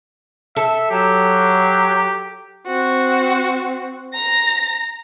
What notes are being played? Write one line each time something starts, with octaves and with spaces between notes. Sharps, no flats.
A4 E5
F#3 G4
C4 F#4
A#5 A#6